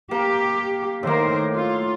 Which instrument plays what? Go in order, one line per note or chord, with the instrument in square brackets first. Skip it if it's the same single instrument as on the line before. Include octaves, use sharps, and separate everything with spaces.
[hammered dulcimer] A#3 A#4 [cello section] G4
[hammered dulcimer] A2 A#3 [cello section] D#3 A#4 C5
[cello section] F4